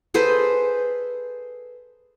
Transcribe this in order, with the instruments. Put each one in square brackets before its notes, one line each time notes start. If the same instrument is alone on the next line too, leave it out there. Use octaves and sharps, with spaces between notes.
[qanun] G#4 A4 B4 C5